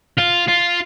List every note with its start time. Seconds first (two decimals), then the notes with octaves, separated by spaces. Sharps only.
0.18 F4
0.48 F4